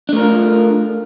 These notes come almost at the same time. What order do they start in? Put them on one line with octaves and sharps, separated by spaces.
D4 A3 A#4 F4